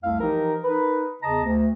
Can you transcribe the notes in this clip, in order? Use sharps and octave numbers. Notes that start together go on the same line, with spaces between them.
C2 F2 A3 E4 F5
E3 F3 D#4 G4 A#4
D#4 A#4 B4
E2 C#3 D#5 A5 A#5
D2